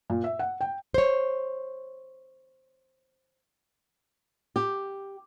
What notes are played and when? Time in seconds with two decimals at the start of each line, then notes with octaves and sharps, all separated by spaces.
0.10 A#2
0.24 E5
0.39 F#5
0.61 G5
0.94 C5 C#5
4.56 G4